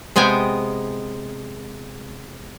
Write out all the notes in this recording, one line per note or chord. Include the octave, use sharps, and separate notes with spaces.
C3 G#3 B3 G5 G#5